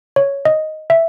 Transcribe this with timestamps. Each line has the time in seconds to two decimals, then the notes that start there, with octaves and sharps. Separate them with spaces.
0.16 C#5
0.45 D#5
0.90 E5